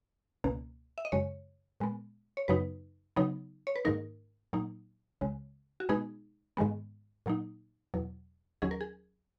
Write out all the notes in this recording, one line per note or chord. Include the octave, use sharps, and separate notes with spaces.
C#2 B2 A#3
E5
D#5
F#2 C#3 G#3 C#5
A#2 G#3 B3
C#5
F#2 C#3 F#3 B3 D#4 B4
C#3 F#3 B3 D#4
C#5
B4
G#2 D#3 A#3 D#4 A#4
A#2 F#3 A#3 D#4
C#2 C#3 G#3
F#4
B2 G#3 B3 D#4 G#4
G#2 D#3 G#3 B3
A#2 F#3 A#3 D#4
E2 B2 F#3
D#2 D#3 F#3 C#4 G#4
A#4
G#4